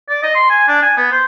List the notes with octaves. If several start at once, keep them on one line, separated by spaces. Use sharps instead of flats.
D5
D#5
C6
G#5
D4
G#5
B3
C5